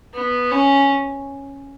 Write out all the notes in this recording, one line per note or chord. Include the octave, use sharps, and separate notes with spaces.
B3
C#4